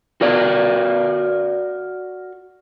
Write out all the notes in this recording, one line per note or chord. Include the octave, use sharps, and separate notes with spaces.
F#4 A#4 D5